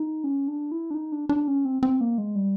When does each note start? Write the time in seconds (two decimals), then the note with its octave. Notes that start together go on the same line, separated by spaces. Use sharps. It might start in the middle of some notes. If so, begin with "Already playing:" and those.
Already playing: D#4
0.24 C#4
0.48 D4
0.72 E4
0.91 D4
0.95 D#4
1.12 D4
1.29 D4
1.48 C#4
1.65 C4
1.83 C4
2.01 A#3
2.18 G#3
2.36 G3